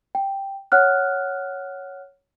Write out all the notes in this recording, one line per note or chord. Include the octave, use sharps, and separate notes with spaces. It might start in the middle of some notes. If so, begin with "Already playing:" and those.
G5
C#5 F#5 F6 F#6